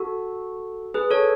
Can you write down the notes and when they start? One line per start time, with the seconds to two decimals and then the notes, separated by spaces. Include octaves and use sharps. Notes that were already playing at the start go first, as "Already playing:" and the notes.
Already playing: F#4 A4
0.94 G#4 B4
1.11 A4 C#5